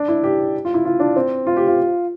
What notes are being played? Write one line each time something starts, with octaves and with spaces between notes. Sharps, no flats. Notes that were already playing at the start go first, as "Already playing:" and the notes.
Already playing: D4
E4
G4
F4
E4
F4
D4
C4
F4
G4
F4